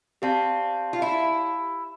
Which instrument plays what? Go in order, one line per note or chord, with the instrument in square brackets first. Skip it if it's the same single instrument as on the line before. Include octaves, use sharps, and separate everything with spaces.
[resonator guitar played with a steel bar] C4 [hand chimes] G4 D5 F5 A5
[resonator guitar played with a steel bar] F4
E4